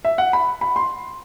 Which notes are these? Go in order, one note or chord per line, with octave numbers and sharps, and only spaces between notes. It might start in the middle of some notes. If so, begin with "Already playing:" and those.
E5
F#5
B5
B5
C6